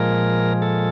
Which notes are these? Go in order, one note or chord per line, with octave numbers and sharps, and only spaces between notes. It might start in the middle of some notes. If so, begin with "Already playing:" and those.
Already playing: A#2 F3 G#3 A#4
A4